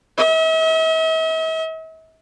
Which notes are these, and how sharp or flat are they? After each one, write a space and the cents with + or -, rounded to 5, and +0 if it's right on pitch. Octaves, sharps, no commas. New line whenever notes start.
E5 -45